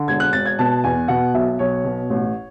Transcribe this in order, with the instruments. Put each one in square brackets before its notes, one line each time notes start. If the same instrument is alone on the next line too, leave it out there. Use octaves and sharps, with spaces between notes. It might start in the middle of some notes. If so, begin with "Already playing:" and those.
Already playing: [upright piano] D3
E1 G#6
F#6
E1 A6
G#6
B2 A5
E2 G#5
B2 F#5
B1 E5
B1 C#5
B2
A1